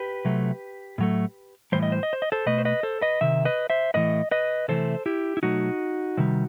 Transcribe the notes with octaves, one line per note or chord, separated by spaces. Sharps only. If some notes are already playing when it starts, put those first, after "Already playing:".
Already playing: G4 B4
C3 F#3 A3
A2 F#3 A3
A2 E3 G3 C5
D#5
C5
D#5
C5
D#5
A4 C5
B2 A3 B4 D#5
C5
B4 D#5
A4 C5
B4 D#5
C3 D#3 E5
B4 D#5
C5 E5
A2 E3 A3 B4 D#5
B4 D#5
C3 E3 A3 A4 C5
E4 G4
E4
B2 F#3 A3 D#4 F#4
C3 D#3 G3